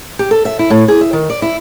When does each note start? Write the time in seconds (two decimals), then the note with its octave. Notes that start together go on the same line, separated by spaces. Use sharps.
0.19 G4
0.31 A4
0.45 E5
0.59 E4
0.70 A2
0.88 G#4
1.01 E5
1.13 D#3
1.30 D5
1.42 E4